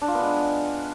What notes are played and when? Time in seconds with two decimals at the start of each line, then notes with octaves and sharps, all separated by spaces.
0.02 D4
0.08 F4
0.15 B3
0.21 G#3